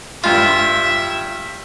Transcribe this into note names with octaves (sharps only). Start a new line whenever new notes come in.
G2 F4 E5 F6